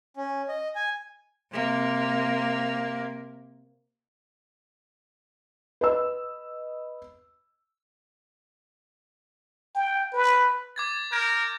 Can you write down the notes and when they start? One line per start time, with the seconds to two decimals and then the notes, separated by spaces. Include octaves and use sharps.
0.17 C#4
0.48 D#5
0.75 G#5
1.52 C3 A#3
5.81 B4 D#5 E6
9.75 G5
10.13 B4
10.76 D6 G#6 A6
11.12 A#4 G6 G#6